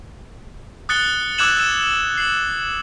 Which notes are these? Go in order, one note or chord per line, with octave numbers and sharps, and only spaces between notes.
D#6 F#6 A6 C#7 G7
D6 E6 F#6 G#6 E7 F#7
E6 E7
C7 F#7